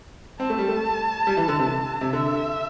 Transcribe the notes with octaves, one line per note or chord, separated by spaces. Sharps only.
C4 A5
A3
G3
A3
G3
E3
D3
C3
C3
D3 E5